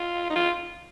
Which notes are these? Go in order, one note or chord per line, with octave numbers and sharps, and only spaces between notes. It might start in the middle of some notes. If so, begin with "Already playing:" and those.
Already playing: F4
D#4
F4